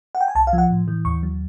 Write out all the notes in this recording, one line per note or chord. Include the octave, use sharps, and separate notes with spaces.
F#5
G5
G#5
C2 A5
F5
F3
F#5
A2
E3
D#2 C#6
F#3